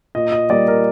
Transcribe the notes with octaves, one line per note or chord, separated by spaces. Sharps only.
A#2 D#5
D#5
G3 A#3 D5
A#4